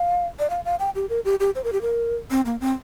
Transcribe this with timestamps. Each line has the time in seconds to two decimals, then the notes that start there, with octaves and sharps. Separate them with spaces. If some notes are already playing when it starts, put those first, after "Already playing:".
Already playing: F5
0.39 D5
0.50 F5
0.65 F5
0.79 G5
0.95 G4
1.10 A#4
1.25 G4
1.40 G4
1.55 C5
1.64 A#4
1.73 G4
1.82 A#4
2.31 C4
2.45 A#3
2.61 C4